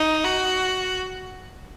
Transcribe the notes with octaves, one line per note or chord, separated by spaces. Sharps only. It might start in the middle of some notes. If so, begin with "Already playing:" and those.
Already playing: D#4
F#4